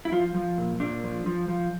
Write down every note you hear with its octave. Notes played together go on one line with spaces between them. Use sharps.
E4
F3 F4
F3
A#2
A#2 D4
F3
F3
F3